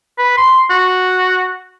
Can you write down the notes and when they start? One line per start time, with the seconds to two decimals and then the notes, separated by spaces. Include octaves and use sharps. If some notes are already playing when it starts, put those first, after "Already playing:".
0.18 B4
0.37 C6
0.70 F#4